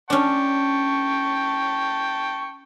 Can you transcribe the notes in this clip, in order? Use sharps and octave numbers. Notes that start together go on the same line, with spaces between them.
C#4 D4 G5 A5 C#6